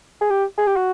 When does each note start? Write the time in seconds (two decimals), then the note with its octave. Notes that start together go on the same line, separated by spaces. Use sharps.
0.21 G#4
0.30 G4
0.58 G#4
0.67 G4
0.76 F#4